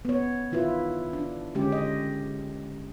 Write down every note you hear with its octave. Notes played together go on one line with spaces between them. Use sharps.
B3 C#5
D#3 E4 F4 B4
D4
D3 G#3 C#4 G4
D#5